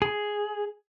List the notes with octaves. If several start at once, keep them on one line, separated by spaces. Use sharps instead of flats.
G#4